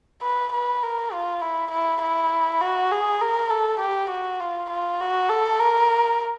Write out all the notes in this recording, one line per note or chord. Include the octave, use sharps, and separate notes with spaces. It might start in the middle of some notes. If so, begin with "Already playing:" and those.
B4
B4
A#4
F4
E4
E4
E4
F#4
G#4
A#4
A4
G4
F#4
F4
F4
F#4
A4
A#4